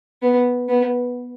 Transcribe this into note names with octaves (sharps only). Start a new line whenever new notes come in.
B3
B3